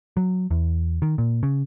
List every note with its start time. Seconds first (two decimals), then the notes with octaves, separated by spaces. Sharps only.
0.17 F#3
0.51 E2
1.02 D#3
1.18 A#2
1.43 C#3